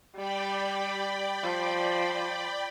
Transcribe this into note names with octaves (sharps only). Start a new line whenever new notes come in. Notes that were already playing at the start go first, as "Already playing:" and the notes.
G3 D5 G5 B5
F3